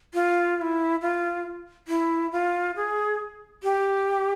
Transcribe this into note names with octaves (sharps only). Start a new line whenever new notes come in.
F4
F4
E4
F4
E4
F4
G#4
G4